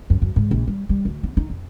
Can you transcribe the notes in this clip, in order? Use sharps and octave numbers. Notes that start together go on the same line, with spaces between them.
F#2
F#2
G#2
A#1
G3
G3
D2
B3
D#4
F2